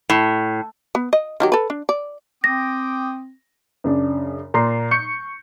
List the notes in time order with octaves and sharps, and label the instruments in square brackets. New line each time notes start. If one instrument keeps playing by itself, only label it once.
[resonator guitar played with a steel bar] A2
[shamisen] B3
D#5
D#3 F#3 G4
A4 B4
D4
D5
[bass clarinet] C4 [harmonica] G5 D6 D#6 [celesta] A#6
[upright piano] F#2 C#3 D4
A#2 A#5 C6 C7
C#6 G6 C#7